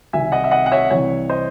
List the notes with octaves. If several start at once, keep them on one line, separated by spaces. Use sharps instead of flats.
C2 C3 D#3 E5 G#5
D#5 F#5
E5
D#5 F#5
F#5
C#5 E5
C2 C3 E3 C#5
C5 D#5